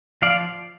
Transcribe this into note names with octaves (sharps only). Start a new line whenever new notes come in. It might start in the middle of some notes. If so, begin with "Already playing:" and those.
F3 D5 F5